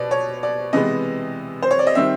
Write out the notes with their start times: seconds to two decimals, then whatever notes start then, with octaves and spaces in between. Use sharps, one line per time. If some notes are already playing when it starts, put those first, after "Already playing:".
Already playing: B2 D5
0.11 C#5
0.43 D5
0.73 C3 E3 G#3 B3 D#5
1.62 C5
1.71 C#5
1.79 D5
1.87 D#5
1.95 D#3 G3 C4 E5